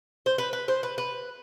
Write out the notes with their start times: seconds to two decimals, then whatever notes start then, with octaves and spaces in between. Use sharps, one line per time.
0.26 C5
0.38 B4
0.53 B4
0.68 C5
0.83 B4
0.98 B4